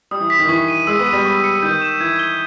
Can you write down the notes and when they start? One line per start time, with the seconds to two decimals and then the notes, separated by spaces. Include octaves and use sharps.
0.11 G3 D#6
0.21 E3
0.30 B6
0.39 D#3
0.49 E3 C#6
0.68 D#7
0.87 G#3 E6
0.99 B3
1.06 D#7
1.12 G3
1.25 C#6
1.44 C#7
1.63 D#3 G6
1.82 E7
2.00 E3 G#6
2.19 G7